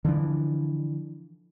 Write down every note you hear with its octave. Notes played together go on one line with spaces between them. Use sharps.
D3 E3 F3 D4